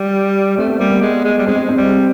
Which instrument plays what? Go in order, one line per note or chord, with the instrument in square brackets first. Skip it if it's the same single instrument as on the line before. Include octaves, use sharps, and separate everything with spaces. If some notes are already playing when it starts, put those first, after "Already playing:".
Already playing: [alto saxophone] G3
[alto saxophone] A3 [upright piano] C4
[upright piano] B3
[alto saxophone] G3 [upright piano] A#3
[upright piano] B3
[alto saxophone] G#3
G#3
G3
[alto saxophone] G#3 [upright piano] C4
[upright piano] C4
[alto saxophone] G3